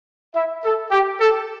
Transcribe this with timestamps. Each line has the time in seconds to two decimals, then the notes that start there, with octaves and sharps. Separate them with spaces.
0.35 E4 E5
0.64 A4
0.91 G4
1.20 A4